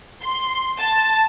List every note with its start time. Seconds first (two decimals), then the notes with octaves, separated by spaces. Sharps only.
0.23 C6
0.79 A5